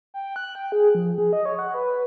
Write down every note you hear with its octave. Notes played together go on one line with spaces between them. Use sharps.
G5
F#6
G5
G#4
F3
G#4
D#5
C#5
F#5
B4
B4